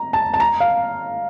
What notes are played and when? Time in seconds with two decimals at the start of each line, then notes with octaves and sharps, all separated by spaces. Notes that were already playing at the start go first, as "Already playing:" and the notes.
Already playing: A#5
0.13 A5
0.34 A5
0.40 A#5
0.60 F5